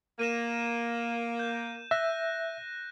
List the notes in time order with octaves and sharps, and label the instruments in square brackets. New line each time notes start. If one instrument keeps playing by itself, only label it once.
[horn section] A#3 [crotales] D#7 E7
[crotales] G6
[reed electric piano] E5 [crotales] F#6 A#6